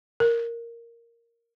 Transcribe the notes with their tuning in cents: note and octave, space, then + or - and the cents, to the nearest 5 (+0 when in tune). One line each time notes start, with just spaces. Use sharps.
A#4 -5